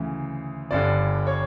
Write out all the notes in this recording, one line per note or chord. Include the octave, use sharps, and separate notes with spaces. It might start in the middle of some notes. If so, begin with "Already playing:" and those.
Already playing: D2 C#3 E3
G1 G2 D3 D5
C#5